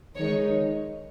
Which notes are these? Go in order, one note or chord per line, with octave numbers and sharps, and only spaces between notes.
D#3 G#3 D#4 C#5